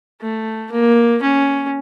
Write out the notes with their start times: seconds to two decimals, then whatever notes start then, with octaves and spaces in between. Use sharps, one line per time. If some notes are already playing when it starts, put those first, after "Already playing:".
0.21 A3
0.72 A#3
1.22 C#4